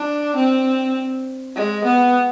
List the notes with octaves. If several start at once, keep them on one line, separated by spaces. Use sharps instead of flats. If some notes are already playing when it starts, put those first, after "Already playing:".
Already playing: D4
C4
G#3
B3